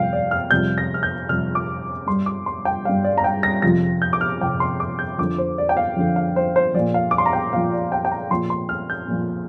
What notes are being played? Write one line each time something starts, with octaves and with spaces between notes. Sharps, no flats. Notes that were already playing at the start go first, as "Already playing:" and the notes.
Already playing: F2 C3 G3 F5 G5
D5
F6
F2 C3 G3 G6
A#6
F6
G6
F2 C3 G3 F6
D6
G2 G3 C6
D6
C6
G5
G2 G3 F5
D5
A#5
G5
A#6
F2 C3 F3 A#6
G6
D6
F6
F2 C3 F3 G5
C6
D6
G6
F2 D3 F3 D6
C5
D5
G5
F5
F2 D3 F3
F5
C5
C5
A#2 F3 D5
F5
D6
C6
A#5
G5
A#2 F3 F5
D5
G5
G5
A#5
A#2 F3 C6
C6
F6
G6
A#2 F3